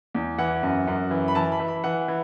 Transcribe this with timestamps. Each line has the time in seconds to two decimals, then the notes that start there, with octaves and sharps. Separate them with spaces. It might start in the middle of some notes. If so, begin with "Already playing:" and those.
0.15 E2
0.38 E3 F#5
0.63 F#2
0.87 F#2
1.11 E3
1.28 B5
1.35 E3 A5
1.52 B5
1.60 E3
1.68 B5
1.84 E3 F#5
2.08 E3